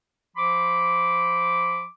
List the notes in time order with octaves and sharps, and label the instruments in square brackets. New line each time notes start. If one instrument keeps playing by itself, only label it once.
[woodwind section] F3 B5 C6 D6